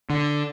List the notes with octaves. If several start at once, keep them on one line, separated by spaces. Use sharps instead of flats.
D3